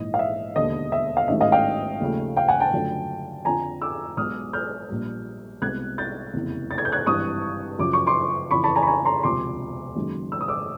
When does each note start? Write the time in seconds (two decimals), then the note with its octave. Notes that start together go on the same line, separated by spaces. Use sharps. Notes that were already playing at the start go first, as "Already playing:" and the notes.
Already playing: A#1 G#2 E3 D#5
0.14 F5
0.19 E5
0.56 E1 D#2 D3 D#5
0.92 E5
1.17 F5
1.28 A1 G#2 D#3 F#3 A3 E5
1.41 D#5 F5
1.52 F5 G5
2.00 D#2 C#3 F3 A3
2.37 F5 G5
2.48 F#5 G#5
2.60 G5 A5
2.73 F#2 D3 F3 A3
3.45 F2 D3 F3 G#5 A#5
3.82 D6 E6
4.17 B1 B2 G#3 D#6 F6
4.53 F6 G6
4.90 A#1 A#2 G3
5.62 C2 B2 G#3 F#6 G#6
5.98 G6 A6
6.34 F1 E2 C#3 E3
6.71 A6
6.78 G#6
6.85 G6
6.92 F#6 G#6
7.06 G#1 G2 E3 G3 C#6 D#6
7.79 F#2 C#3 F3 D6
7.93 C#6
8.07 C6 D6
8.51 F2 C#3 E3 B5 C#6
8.64 A5 B5
8.75 G#5 A#5
8.83 B5
8.87 G#5 A#5
9.05 A#5 C6
9.23 E1 D2 C3 F3 C6 D6
9.96 F#1 F#2 D#3 G#3
10.32 E6
10.41 D#6
10.48 D6 E6